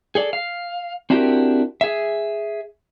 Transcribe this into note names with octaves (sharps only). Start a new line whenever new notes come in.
G#4 A4 D5
F5
C4 D4 E4 F#4 G4 A#4
G#4 E5